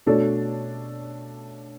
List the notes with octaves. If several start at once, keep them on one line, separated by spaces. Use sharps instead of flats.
B2 A3 D4 A4 C#5